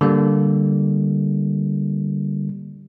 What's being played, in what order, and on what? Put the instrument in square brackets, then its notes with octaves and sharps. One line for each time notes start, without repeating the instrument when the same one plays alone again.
[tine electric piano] D3 G3 A#3